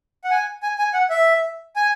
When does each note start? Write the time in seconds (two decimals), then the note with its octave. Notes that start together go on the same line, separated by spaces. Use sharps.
0.24 F#5
0.31 G#5
0.63 G#5
0.78 G#5
0.93 F#5
1.10 E5
1.76 G#5